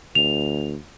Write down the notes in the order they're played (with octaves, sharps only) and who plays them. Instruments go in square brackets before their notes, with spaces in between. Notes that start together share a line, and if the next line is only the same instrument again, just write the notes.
[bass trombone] D2 [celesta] F7